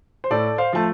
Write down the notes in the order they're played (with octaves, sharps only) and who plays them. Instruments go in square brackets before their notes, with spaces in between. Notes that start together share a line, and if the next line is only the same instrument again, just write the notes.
[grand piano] C5
A2 A4 D5
C5 F5
F3 A3 A5